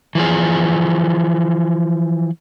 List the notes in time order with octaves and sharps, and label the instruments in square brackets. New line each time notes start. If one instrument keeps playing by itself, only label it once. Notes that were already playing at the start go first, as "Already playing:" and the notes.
[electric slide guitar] E3 F3 G#4